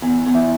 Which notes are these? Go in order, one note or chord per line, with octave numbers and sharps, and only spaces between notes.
E2
E2
E4